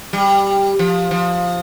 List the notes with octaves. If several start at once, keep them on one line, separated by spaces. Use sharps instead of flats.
G3
F3
F3